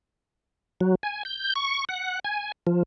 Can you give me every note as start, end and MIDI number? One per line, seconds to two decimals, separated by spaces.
0.81 0.95 54
1.03 1.23 80
1.25 1.53 91
1.56 1.85 85
1.89 2.19 78
2.25 2.52 80
2.67 2.83 53